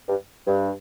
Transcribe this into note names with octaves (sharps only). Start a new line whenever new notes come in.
G2
G2